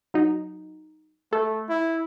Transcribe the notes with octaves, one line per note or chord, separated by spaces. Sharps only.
F#3 D#4
A3 A4
E4